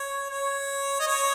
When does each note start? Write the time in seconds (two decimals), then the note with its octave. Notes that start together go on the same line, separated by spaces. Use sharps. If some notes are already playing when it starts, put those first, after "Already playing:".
Already playing: C#5
0.30 C#5
1.00 D#5
1.07 C#5